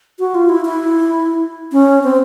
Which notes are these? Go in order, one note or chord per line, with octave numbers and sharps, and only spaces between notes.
F#4
F4
E4
E4
C#4
C4